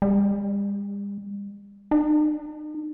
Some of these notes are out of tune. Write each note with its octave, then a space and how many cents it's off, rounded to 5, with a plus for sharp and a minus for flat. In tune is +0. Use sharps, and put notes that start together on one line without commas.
G3 +45
D#4 -40